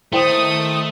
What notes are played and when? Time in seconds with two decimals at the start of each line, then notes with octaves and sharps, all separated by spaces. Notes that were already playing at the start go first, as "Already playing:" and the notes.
0.12 D#3 A3 E4 C5 G5 D#6